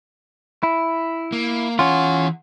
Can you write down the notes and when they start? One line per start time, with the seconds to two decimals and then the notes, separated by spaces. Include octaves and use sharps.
0.63 E4
1.32 A#3
1.79 E3 C#4 F4 F#5